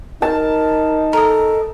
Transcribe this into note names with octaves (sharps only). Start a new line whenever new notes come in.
D#4 A#4 A5
A4 A#4 D#5